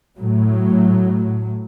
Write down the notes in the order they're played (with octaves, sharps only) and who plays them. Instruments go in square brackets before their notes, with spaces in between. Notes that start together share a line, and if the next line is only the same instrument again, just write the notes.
[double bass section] A2 F#3